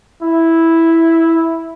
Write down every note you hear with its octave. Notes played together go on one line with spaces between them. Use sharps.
E4